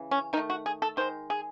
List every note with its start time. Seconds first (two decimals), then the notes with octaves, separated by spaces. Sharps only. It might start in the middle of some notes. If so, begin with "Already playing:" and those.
Already playing: C#3 E3
0.11 C#4
0.33 D#3 D#4
0.37 A3
0.50 F#4
0.66 G#4
0.82 A4
0.97 D#3 G#3 C5
1.30 G#4